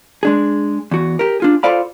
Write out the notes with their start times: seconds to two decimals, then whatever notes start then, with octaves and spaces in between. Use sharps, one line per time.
0.23 G#3 D4 G#4
0.91 E2 F#4
1.19 G4 A#4
1.40 D4 F4 G#4
1.63 F4 A4 C5 D5 F5 B5